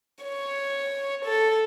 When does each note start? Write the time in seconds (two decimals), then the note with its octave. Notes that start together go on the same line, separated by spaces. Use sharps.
0.25 C#5
1.25 A4